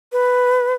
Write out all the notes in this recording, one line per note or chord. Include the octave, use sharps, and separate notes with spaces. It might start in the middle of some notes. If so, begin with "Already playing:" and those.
B4